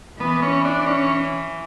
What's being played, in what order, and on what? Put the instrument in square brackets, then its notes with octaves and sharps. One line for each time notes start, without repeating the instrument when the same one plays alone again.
[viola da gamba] E3 [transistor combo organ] B3
[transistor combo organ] C#4
D4
C#4